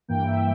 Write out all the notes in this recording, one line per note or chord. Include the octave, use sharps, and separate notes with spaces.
G2 E3 A#3 G5
E5